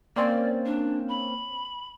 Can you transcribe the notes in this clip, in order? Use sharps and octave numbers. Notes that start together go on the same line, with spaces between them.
A#3 C4 C#4 D5
D4
B5